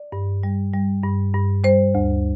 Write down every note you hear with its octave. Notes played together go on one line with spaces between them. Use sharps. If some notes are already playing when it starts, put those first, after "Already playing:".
Already playing: D5
G2
G3
G3
G2
G2
G3 C5
D2